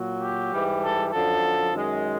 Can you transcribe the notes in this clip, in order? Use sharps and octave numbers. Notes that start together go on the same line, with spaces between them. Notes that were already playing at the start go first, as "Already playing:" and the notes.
Already playing: A#2 F#3
G4
G#2 E3 G3
A4
F#2 D3 F3 A4
F#2 D#3 G#3